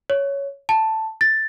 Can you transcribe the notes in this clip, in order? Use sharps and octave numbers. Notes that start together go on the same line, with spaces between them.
C#5
A5
A6